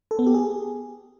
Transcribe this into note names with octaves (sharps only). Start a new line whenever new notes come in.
A4
B3
G4
G#4